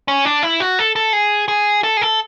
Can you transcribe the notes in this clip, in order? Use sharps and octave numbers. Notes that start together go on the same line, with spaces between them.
C#4
D4
E4
F#4
A4
A4
G#4
G#4
A4
G#4
A4